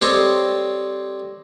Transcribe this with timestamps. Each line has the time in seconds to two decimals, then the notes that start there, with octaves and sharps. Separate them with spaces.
0.02 G3 C4 A4 C5 C#5 D#5